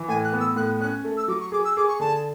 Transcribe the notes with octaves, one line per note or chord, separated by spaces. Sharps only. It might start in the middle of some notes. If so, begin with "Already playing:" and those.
Already playing: E3
A2 G#5
F#6
B3
E6
A2 F#6
C#4 F#6
A3
E6
F#3 D6
C#6
G#4 D6
E6
G#4 D6
C#6
D3 A5